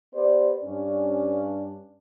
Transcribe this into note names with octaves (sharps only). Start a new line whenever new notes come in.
B3 G4 C5 D5
G2 C#4 D4